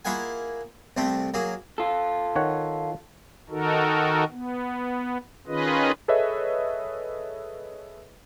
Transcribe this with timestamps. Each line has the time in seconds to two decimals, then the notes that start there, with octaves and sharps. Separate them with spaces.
0.05 A#3 E4 F4 G#4 F#5 G#5
0.97 C2 C3 A3 C4
1.34 F#3 A#3 G#4
1.78 F4 A4
2.36 D#3 C#5 F#5
3.50 D#3 D#4 F#4 A4 A#4
4.31 B3
5.47 D#3 C#4 F4 G#4 B4 D#5
6.08 G#4 A4 B4 C#5 D#5 E5